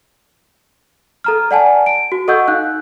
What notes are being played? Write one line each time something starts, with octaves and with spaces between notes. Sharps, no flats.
A4 A#5 F6
D5 F#5 G#5 A5
D7
F#4
A4 D#5 F#5 C#6 E6 G6
D#4 F5 F#6